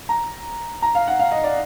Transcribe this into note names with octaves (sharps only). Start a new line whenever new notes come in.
A#5
A#5
F5
F#5
F5
D#5
D5